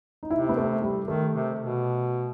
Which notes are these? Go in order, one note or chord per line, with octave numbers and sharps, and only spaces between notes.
D#4
C3 E4
B3
A3
G3
D#3 A3
C3
B2